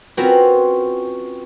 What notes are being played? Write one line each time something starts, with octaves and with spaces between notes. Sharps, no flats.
C4 C#4 F4 F#4 A#4 B4